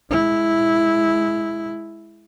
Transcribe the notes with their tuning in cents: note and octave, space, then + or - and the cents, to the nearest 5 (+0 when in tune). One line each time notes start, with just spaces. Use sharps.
G#3 +15 E4 +0